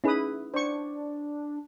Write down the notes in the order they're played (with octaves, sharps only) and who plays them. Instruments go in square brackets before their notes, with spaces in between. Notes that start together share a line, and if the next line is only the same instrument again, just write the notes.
[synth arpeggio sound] C#4 D#4 G#4 [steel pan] E4 B4 D#6
[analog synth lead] D4 [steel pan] C5 C#6